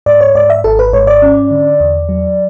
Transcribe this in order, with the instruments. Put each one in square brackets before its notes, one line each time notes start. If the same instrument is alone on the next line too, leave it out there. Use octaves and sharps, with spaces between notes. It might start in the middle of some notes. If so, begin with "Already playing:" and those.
[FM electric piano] G#2 D5
C#5
G#2 D5
E5
G#1 A4
B4
G#2 C#5
D5
C#4
D3
E2
F#3